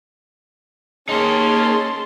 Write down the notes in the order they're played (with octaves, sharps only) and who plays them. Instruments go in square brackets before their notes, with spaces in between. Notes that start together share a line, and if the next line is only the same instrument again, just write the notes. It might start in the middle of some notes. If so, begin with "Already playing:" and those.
[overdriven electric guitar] A#3 D#4 [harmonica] C#4 [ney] G#4 [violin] A5 C6